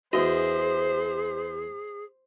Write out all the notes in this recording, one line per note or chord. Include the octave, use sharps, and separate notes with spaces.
E2 F#4 G#4 C5 D#5